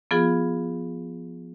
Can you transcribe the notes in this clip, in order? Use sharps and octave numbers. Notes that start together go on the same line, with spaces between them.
F3 B3 F4 G#4